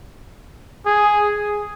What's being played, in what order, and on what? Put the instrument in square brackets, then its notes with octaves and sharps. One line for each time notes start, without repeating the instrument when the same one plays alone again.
[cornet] G#4